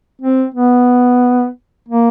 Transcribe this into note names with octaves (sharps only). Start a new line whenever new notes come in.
C4
B3
A#3